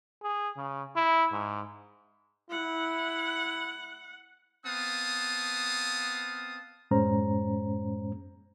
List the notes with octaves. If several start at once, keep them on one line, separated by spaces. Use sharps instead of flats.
G#4
C#3
E4
G#2
E4 F#5
B3 C4 F5 A5 D#6
F#2 A2 G#3 C#4 C5 A#5